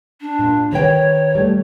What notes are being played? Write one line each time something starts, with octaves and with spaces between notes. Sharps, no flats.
D4
A#2
D#3 B4 C#5 G5
G3 A3